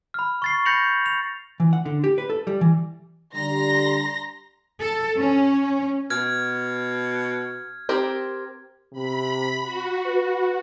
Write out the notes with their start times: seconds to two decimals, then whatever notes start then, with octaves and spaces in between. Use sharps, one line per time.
0.14 B5 F6
0.42 C#6 A6 C7
0.65 B5 G6 A#6 C#7 F7 F#7
1.06 F7
1.60 E3
1.73 F#5
1.86 D3
2.04 G4
2.18 B4
2.30 A4
2.47 G3
2.61 E3
3.35 D3 G3 A#5 C6 A#6
4.80 A4
5.17 C#4
6.10 B2 F6 G#6
7.89 C4 G4 A#4
8.93 C3 B5
9.62 F#4
10.06 B4